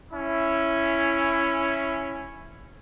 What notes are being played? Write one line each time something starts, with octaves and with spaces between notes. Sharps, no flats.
C#4 E4